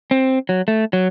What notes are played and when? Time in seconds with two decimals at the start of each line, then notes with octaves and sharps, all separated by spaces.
0.11 C4
0.49 F#3
0.68 A3
0.93 F#3